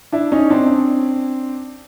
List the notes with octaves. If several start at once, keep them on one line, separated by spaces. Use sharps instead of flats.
D4 E4
C#4 D#4
C4 D4